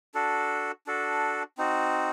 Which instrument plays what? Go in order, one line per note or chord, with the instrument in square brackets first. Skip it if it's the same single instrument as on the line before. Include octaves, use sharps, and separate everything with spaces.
[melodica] D4 F#4 A4
D4 F#4 A4
C4 D#4 F#4